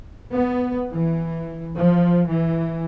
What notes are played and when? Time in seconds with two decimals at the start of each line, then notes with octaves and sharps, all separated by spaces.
0.33 B3
0.91 E3
1.77 F3
2.30 E3